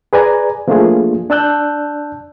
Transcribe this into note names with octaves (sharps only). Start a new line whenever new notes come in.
G#4 B4 D5 G#5 A#5
F3 A3 A#3 D4 F4 G#4
D4 D5 A5 E6 F#6 G6